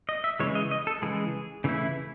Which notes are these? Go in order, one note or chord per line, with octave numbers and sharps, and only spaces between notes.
D#5
E5
C#3 E3 G#3 C#5
D#5
D#5
A4
C#3 E3 G#3 G#4
C#3 E3 A3 E4